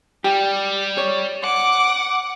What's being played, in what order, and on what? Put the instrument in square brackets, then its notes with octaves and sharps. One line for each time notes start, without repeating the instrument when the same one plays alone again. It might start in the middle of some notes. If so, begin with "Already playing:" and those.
[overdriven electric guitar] G3 [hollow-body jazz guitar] G4
[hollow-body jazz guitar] C#5
[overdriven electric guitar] F#5 [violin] D6